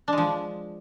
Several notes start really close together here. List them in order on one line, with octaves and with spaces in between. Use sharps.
D4 G#3 F3